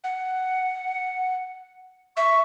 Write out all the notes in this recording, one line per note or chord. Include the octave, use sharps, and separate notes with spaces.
F#5
E5 C#6